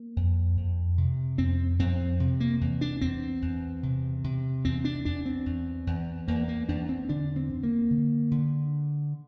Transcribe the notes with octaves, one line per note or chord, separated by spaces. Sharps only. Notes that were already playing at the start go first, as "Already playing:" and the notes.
Already playing: A#3
F2
F2
C3
F2 C4
F2 C4
C3
A#3
E2
D4
E2 C4
E2
C3
C3
E2 C4
D4
E2 D4
C4
E2
E2
E2 A#3
A#3
E2 D4
C4
D3 D4
C4
D3
A#3
D3
D3